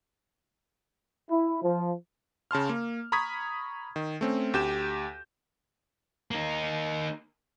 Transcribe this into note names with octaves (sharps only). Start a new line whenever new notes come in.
E4
F3
C#3 A5 C6 F6
A#3
A#5 B5 C#6 D#6 G#6 B6
D#3
A3 C4 C#4
D2 G4 G6 E7
A#3 D#4